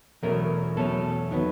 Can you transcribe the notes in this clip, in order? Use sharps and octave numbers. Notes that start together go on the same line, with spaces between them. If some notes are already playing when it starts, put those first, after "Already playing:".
E2 B2 F#3 A3 C#4 A#4
E2 B2 F#3 A3 C#4 A4
D#3 F#3 B3